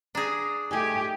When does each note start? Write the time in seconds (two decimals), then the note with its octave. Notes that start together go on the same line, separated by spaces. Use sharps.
0.15 D4 G#4 A#5
0.71 A3 D#4 G4 G#5